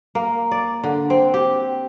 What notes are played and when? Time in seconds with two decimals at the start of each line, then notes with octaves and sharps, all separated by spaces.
0.15 A#3
0.51 D5
0.84 D3
1.10 C4
1.34 G4